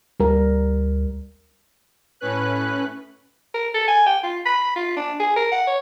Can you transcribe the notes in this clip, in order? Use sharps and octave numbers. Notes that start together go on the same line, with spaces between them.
D2 G3 A#4
A2 C#4 B4 F#6
A#4
A4
G#5
G5
F4
B5
F4
D4
G#4
A#4
F#5
C#5